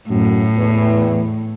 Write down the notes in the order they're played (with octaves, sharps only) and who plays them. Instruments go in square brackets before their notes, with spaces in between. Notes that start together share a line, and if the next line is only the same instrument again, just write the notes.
[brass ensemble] F#2 F#3 [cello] A2
[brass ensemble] E2 E3